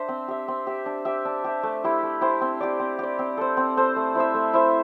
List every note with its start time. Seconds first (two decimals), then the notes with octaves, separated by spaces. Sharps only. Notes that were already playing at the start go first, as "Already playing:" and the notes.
Already playing: D4 C5 E5
0.09 C4
0.28 G4 E5
0.48 C4
0.67 G4 E5
0.86 D4
1.05 G4 E5
1.25 D4
1.44 G4 E5
1.63 A3
1.84 E4 G4 C5
2.03 A3
2.21 E4 G4 C5
2.41 C4
2.61 G4 D5
2.80 C4
2.99 G4 D5
3.19 C4
3.37 A4 C5
3.57 C4
3.77 A4 C5
3.96 A3
4.15 E4 C5 E5
4.34 A3
4.54 E4 C5 E5